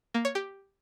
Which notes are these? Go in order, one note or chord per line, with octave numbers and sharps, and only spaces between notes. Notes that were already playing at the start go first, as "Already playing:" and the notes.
A#3
C#5
G4